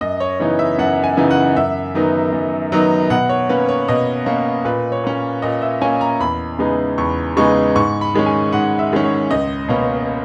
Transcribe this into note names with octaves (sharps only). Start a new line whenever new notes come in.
F#2 D#5
C#5
C#3 E3 B3 D#4 C#5
E5
F#2 F#5
G#5
C#3 E3 B3 D#4
F#5
F#2 E5
D#3 F#3 B3 D#4
F#2
D#3 F#3 B3 D#4
B2 F#5
C#5
A#3 C#4 B4
C#5
B2 D#5
A#3 C#4
A#2 B4
C#5
A#3 C#4
A#2 D#5
E5
A#3 C#4 G#5
A#5
E2 B5
C#3 G#3 B3 D#4
E2 C#6
C#3 G#3 B3 D#4 C#6
G#2 C#6
B5
D#3 G#3 C#4
G#5
G#2 F#5
E5
D#3 G#3 C#4
C#5
C#2 D#5
B2 A#3 C#4